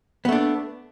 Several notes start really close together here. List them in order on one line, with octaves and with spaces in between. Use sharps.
B3 A3 D4